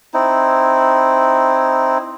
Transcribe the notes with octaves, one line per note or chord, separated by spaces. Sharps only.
C4 D#4 E4